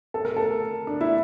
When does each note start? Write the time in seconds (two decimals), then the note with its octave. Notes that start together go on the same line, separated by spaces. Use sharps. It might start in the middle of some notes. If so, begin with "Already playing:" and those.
0.14 A4
0.25 A#4
0.36 A4
0.87 D4
1.01 E4